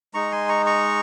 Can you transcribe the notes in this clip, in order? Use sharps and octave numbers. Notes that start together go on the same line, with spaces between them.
G#3 D#4 A#5 C#6
G#5 C6
A#5 C#6
A#5 C#6